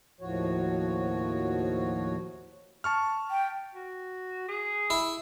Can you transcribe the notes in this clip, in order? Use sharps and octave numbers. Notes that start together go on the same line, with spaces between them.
D#2 A2 F3 F#4 C#5
A5 C#6 F6
G5
F#4
G#4
E4